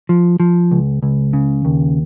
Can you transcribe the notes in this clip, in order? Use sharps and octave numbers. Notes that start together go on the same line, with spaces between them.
F3
F3
C#2
C#2
C#3
D#2